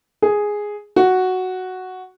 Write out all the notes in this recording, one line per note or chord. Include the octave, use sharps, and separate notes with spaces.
G#4
F#4